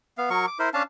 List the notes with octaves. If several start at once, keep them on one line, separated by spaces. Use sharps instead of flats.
B3 F5
F#3 A#4 C#6
D6
E4 A#4 C5
C#4 D4 F5 A5